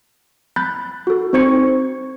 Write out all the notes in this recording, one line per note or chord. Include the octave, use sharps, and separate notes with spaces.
B5 F#6 G6 A6
F#4 A4
C4 D#4 C5 C#6 G#6 C#7